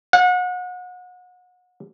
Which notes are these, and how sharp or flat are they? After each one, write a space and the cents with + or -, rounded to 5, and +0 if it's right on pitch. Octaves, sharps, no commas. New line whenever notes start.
F#5 -35